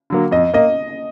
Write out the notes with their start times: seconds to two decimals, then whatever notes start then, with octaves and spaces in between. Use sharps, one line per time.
0.10 D3 F#3 A#3
0.31 F2 D#5
0.54 A#3 D#5